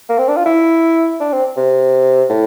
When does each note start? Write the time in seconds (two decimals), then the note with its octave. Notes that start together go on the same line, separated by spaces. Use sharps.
0.09 A#3
0.18 C4
0.28 D4
0.37 F4
0.46 E4
1.20 D4
1.33 C4
1.57 C3
2.30 A2